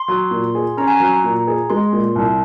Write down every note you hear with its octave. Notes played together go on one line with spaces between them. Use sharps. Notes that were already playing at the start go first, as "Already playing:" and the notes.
Already playing: C6
F#3
A#2
G#4
C#4 A#5
G#5
F#3 A#5
A#2
G#4
G#3 C6
A#2
C2